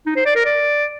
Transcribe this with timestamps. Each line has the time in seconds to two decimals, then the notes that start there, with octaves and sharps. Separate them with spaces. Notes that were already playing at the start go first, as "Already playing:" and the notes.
0.06 D#4
0.16 C5
0.26 D5
0.35 A#4
0.45 D5